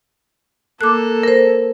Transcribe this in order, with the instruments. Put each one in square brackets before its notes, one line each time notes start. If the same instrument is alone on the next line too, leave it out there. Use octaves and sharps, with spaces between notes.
[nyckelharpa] A#3 A4 [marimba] D6 F#6
[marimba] A#4 C5